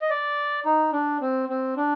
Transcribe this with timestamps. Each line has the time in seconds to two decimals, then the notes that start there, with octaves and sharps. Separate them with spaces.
0.02 D#5
0.10 D5
0.66 D#4
0.93 D4
1.21 C4
1.49 C4
1.77 D4